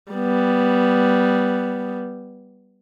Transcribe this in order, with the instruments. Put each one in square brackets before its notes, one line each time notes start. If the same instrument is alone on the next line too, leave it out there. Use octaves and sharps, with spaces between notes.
[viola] G3 B3